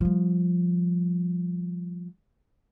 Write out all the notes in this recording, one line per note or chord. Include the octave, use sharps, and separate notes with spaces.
F3 G3